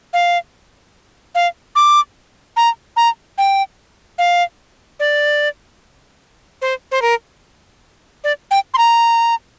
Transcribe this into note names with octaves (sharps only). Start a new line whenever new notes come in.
F5
F5
D6
A#5
A#5
G5
F5
D5
C5
C5
A#4
D5
G5
C6
A#5